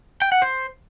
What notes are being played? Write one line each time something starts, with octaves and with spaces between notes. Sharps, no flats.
G5
F#5
C5